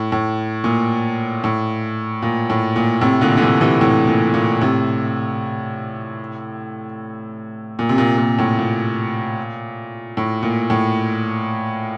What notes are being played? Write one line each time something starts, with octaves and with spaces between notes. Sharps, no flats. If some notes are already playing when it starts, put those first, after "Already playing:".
Already playing: A2
A2
A#2
A2
A#2
A2
A#2
A2 C3
A#2 D3
D3
C3 E3
C3 E3
A2 C3
A#2
A#2
A2 C3
A#2
C3
A#2
A#2
A2
A#2
A2
A#2
A2